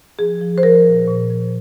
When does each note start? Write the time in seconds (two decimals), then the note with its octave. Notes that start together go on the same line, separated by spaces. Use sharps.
0.19 F3 G#4
0.41 F3
0.58 C5
0.63 F3 A#4
0.86 A#2
1.08 A#2
1.30 F3